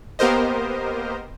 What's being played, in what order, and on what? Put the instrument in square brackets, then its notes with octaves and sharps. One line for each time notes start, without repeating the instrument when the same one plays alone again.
[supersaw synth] A#3 B3 G4 A#4 C5 D#5